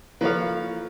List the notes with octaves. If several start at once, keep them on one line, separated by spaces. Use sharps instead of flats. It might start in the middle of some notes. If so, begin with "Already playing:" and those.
F3 A#3 E4 A4 B4 C#5 F5